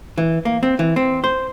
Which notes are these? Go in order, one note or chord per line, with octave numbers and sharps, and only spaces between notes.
E3
A#3
C4
E3
C4
C5